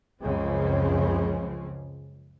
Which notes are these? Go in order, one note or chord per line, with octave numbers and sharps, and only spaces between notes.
C#2 F#2 C#3 F3 C4 C#4